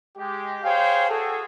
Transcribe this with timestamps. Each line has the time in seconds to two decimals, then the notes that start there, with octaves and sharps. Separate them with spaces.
0.17 G#3 G4
0.64 G#4 C5 C#5 F5 G5
1.09 F#4 G#4 A4